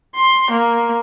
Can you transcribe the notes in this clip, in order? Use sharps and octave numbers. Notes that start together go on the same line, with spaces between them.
C6
A#3